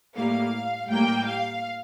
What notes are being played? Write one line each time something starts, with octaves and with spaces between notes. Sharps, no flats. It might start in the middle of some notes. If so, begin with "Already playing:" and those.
A2 G3 A#3 F5
A2 G3 A#3 G5
F5